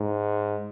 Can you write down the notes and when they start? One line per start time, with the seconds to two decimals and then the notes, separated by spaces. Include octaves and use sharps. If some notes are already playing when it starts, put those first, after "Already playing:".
Already playing: G#2